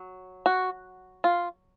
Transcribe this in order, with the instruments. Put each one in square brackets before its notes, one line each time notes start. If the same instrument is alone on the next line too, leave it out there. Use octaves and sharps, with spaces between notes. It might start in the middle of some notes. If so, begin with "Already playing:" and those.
Already playing: [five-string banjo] F#3
F#4
F4